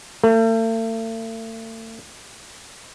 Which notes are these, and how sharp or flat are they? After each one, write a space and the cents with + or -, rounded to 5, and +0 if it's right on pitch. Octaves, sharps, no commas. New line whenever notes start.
A3 +40